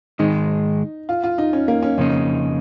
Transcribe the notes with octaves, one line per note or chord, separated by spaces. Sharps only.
G#2 D#3 G#3 D#4
F4
F4
D#4
C#4
A#3
C#4
F2 C#3 A#3 C#4 D#4